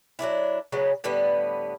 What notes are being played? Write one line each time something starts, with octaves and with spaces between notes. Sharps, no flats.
F#3 A3 D4 E4
C#3 F#3 G#3 B3
A2 D3 G3 B3